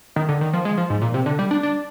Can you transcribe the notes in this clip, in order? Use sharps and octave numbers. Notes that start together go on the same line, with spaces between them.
D#3
D3
D#3
F3
G#3
F3
G#2
A#2
C3
D3
G3
D4
D4